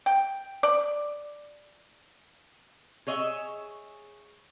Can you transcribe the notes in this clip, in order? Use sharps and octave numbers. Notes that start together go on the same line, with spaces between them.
G5
D5
G#4 C#5 D#5 E5